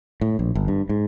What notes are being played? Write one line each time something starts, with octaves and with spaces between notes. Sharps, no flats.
A2
A#1
G1
G2
G#2